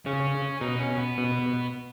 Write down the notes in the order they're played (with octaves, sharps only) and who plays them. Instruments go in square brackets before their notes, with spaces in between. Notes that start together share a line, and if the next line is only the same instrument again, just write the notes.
[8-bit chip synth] C#3 [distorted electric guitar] C#4
[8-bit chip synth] B2 [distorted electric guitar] D#4
[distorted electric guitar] C#4
B3
[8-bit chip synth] B2